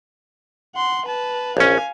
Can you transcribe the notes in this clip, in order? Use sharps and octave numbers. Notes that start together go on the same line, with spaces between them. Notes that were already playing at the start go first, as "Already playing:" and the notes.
F#5 C6
B4 A5
A#1 C#4 F5 G#5